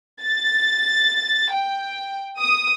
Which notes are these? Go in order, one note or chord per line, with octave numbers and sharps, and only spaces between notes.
A6
G5
D#6